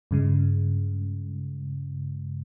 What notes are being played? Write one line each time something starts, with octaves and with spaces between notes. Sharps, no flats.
G2 C#3 G#3